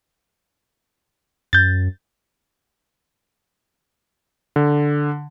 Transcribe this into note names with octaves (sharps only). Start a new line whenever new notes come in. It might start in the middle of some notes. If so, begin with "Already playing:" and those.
F#2 G6 A6
D3